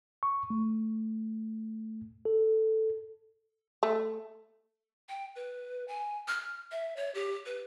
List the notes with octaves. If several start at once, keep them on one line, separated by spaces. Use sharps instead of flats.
C#6
A3
A4
A3
G5
B4
G#5
F6
E5
C#5
G4
B4